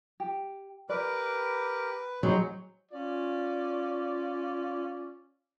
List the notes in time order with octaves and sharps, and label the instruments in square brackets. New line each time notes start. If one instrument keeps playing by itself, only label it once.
[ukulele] G4
[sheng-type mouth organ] G4 A#4 D6 [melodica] B4 [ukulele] D5
[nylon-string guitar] F#3 [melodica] G3 [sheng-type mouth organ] D#4 G#4 C5
[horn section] C#4 F4 D5